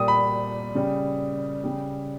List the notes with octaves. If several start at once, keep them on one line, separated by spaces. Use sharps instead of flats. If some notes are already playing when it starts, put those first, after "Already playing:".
Already playing: A#2 G3 D#6
B5
C#3 G3
C#3 G3